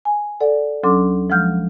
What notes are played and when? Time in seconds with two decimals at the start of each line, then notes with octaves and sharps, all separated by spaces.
0.05 G#5
0.41 A4 D5 F#5
0.84 D2 F#3 C#4 A4 C6 D6
1.30 F3 G#3 F#5 F6 G6